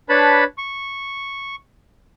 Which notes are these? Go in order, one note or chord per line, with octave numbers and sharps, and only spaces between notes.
D4 B4 C#5 A5 B5
C#6